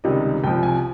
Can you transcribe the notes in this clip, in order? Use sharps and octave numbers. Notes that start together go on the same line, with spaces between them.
C#2 C3 D#3 G3 D#5
C2 C3 F3 G5
G#5